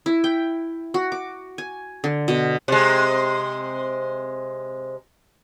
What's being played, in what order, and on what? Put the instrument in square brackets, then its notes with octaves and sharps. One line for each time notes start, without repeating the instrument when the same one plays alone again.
[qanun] E4
G5
F#4
D6
G#5
D3
B2
[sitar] C3 G#3